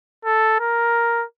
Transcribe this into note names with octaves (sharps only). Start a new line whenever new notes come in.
A4
A#4